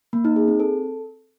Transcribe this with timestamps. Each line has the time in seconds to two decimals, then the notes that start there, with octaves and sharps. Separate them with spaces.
0.13 A#3
0.25 D#4
0.36 G#4
0.48 C4
0.60 A4